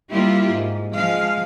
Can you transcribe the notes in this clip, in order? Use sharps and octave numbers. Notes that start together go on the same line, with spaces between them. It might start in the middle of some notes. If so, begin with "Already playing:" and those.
G3 A#3 E4 F4 G4
G#2
F3 G#3 F5